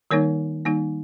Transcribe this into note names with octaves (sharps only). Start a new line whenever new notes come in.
D#3 G3 A#3 D#4 A#4 C#5
D#3 G3 A#3 D#4